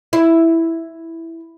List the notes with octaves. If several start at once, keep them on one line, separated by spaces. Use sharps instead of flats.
E4